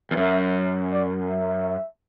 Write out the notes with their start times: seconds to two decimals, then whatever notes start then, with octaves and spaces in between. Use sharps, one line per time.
0.11 E2
0.17 F#2 E5
0.92 D5
1.30 E5